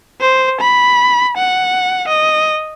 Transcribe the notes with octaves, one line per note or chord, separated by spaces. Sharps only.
C5
B5
F#5
D#5